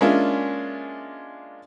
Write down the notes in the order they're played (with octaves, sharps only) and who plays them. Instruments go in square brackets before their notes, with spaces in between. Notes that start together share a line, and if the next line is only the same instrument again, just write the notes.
[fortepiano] G#3 A#3 C#4 D4 F4 E5